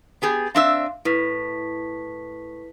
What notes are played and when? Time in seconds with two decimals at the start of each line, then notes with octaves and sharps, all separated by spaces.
0.22 B3 G4 G#4
0.55 C4 D4 E5 F5 C6
1.05 A2 E4 B4 B6